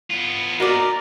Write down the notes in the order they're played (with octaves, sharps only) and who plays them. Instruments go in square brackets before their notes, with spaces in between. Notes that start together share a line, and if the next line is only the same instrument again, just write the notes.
[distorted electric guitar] B3 F4
[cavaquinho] D#4 D5 [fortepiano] F#4 [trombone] A#4